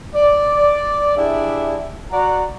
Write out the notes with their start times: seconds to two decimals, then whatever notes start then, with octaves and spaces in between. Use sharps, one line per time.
0.15 D5
1.17 D4 E4 G4 G#4 E5
2.11 F#4 D5 F#5 A#5